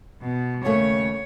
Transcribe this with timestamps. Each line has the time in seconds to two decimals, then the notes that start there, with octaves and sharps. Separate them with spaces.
0.21 B2
0.65 D#2 C#3 A3 C#5